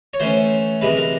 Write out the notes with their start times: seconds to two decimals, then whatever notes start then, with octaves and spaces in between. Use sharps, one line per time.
0.14 C#5
0.20 E3 A3 C#4 C5
0.81 C3 E3 G#3 B4
0.97 A#4